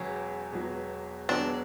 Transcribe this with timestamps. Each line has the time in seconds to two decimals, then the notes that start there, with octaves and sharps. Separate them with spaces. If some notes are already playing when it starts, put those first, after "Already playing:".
Already playing: E1 E2 B2 F#3 C#4
0.52 E1 E2 B2 F#3
1.29 E1 E2 B2 F#3 D4